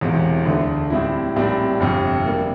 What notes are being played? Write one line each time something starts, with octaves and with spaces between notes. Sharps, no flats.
E1 E2 C3
D2 D3 A3
A2 G3 C4 E4
A#1 A2 G3 C4
G1 F2 C3
C3 G3 A#3